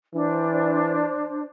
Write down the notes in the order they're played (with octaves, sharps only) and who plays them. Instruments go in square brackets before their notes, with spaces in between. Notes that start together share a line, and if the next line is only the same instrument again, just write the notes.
[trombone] E3 [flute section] D4 C5